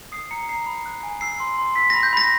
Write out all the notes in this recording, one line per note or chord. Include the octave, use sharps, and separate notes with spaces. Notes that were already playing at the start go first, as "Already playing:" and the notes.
D#6 C7
A#5 C#7
A#5 C7
B5
F#6
G#5
E6 C7
C6
C6
E6 B6
B5 A#6
G6
B5 A#6